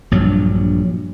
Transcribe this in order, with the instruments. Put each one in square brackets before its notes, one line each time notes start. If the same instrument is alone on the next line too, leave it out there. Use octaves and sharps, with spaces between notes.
[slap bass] A#1 G2 F#3